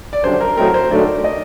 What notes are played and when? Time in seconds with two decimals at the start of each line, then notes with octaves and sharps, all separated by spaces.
0.13 D5
0.24 F#2 D3 G3 D4 C5
0.41 A#4
0.57 A2 F#3 A3 C4 D#4 A#4
0.74 C5
0.90 D3 F#3 A3 D#4 D5
1.24 D#5